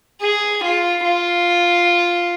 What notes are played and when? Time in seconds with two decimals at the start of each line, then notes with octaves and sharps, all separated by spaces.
0.21 G#4
0.63 F4
1.04 F4